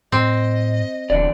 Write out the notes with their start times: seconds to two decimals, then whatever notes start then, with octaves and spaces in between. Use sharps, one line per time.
0.12 A2 C4 D#5
1.10 D#1 E2 D3 D5